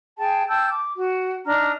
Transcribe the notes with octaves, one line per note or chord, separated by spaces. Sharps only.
G#4 G5 A5
G5 A5 E6 G6
D6
F#4
D4 D#4 A#5 F6